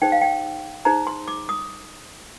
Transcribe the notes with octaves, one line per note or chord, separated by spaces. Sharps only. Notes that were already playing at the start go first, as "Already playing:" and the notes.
D#4 G#4 C5 G5
F5
G5
D#4 G#4 C5 A#5
C6
D6
D#6